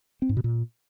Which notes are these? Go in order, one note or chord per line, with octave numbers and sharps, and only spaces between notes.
C4
G#2
B2
A#2